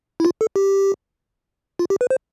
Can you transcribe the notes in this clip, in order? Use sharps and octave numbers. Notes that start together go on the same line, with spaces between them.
E4
F4
A4
G4
F4
G4
B4
C5